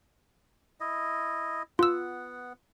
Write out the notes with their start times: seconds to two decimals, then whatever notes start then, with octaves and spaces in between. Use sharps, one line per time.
0.80 E4 D#5
1.79 B3 F4 F#5 E6